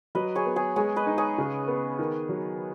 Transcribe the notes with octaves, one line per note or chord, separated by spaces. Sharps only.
F#3 B4 D#5
G#4 C#5
B3
G#4 C#5
G#3 G#4 C#5
B4 D#5
D#4
G#4 C#5
C#3
B3
D#3
F#3